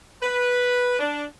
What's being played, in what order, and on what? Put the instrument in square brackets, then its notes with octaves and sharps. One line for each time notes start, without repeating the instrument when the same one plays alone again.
[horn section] B4
D4